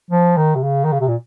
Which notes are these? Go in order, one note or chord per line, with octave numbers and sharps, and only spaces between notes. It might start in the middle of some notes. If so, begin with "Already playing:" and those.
F3
D#3
C3
C#3
D#3
C#3
C3
A#2